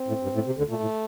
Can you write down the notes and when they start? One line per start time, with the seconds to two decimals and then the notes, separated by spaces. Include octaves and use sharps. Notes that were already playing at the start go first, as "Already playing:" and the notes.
Already playing: C4
0.08 A2
0.23 G2
0.34 A2
0.46 C3
0.58 D2 D3
0.69 A#2 A3
0.81 A2